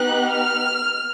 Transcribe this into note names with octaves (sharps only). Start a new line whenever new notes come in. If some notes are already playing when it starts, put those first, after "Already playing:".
Already playing: B3 D#4 G4 F#6
F6